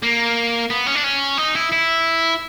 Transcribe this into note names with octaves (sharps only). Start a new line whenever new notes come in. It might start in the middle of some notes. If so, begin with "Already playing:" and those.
A#3
B3
C#4
D4
C#4
D#4
E4
E4